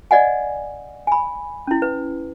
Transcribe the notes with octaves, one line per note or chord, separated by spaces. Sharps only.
D5 D#5 F#5 G#5
G#5 B5
C#4 E4
B4